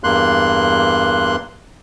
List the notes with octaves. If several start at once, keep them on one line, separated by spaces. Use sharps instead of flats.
E2 G2 A#3 C6 F#6